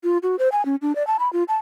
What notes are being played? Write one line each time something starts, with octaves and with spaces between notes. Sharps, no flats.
F4
F#4
C5
G#5
C#4
D4
D5
A5
B5
F4
A5